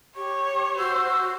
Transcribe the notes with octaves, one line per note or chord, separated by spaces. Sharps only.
G4 C#5
F#4 C5 E6